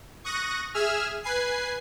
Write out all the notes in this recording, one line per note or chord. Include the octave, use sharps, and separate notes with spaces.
C#6 D#6 F#6 A#6
G#4 E5 G#5 E6 F6
B4 G#5 C7